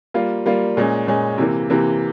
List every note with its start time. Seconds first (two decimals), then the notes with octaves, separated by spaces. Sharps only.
0.14 G3 A#3 F4
0.46 G3 A#3 F4
0.77 A#2 G#3 C#4
1.07 A#2 G#3 C#4
1.38 C3 E3 A#3
1.70 C3 E3 A#3